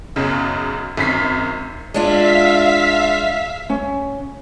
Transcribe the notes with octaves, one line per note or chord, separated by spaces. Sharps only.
B1 F#2 C#3
G#1 F#2 B6 C7
G#3 D4 F4 E5 F5 B6
C#4